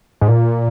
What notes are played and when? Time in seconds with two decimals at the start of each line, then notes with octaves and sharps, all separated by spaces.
0.21 G#2
0.28 A#2